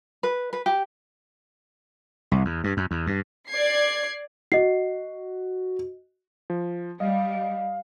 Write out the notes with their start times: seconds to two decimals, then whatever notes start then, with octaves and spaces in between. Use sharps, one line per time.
0.23 B4
0.53 B4
0.66 G4
2.31 C2
2.45 E2
2.64 G2
2.77 F#2
2.91 E2
3.07 G2
3.49 D5 G#6 C7
4.52 F#4 D#5 C7
6.50 F3
7.00 G3 D#5 F5